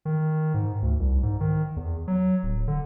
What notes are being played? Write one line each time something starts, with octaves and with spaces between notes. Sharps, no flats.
D#3
G#2
D2
C2
G#2
D#3
E2
F#3
D1
D3